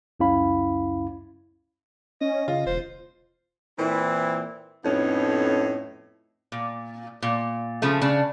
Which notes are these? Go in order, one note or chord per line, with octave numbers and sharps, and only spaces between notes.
C#2 F#2 C#4 E4 F5 B5
C#4 D#5
C#3 F4 D#5
E1 C5
A#2 E3 C4 E4
F2 A2 B3 C#4 D#4
A#2
A#2
C#3 F3 A3
C#3 D4